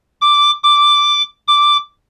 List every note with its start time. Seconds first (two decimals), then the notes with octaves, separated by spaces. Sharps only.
0.21 D6
0.63 D6
1.48 D6